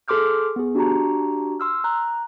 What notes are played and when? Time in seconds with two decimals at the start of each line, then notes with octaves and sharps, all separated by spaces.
0.08 G#4 A4 C6 D6 F6 G6
0.56 B3 G#4
0.75 D4 F#4 G4 A5 A#5
1.60 C6 E6 F6
1.84 A#5 F#6